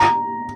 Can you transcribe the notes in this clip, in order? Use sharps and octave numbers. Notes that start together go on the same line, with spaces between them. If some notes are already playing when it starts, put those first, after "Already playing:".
Already playing: A#5